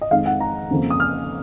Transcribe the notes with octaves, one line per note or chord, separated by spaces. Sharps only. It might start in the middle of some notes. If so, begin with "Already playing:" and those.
D#5
F2 D#3 G#3 F5
F#5
A#5
F2 C#3 F3 A#3
D#6
F6